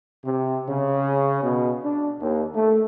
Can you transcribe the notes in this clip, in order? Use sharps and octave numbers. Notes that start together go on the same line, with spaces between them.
C3
C#3
B2
D4
D#2
A3